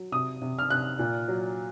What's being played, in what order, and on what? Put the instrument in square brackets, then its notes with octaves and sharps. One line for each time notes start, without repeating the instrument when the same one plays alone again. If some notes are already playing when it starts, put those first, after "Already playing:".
Already playing: [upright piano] F#3
C3 D#6
C3
F6
C3 F#6
A#2
F#3